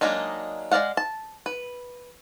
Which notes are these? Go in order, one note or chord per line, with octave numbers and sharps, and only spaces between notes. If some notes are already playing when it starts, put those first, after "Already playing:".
F#3 G#3 A#3 D4 D#4
G#3 C5 D5 F5 F#5
A5
B4